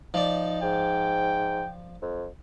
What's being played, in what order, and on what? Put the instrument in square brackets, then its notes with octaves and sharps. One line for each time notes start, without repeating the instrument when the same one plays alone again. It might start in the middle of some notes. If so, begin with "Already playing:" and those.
[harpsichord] F3 D5 [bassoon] D#4
[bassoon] G#2 [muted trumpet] G5
[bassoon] F2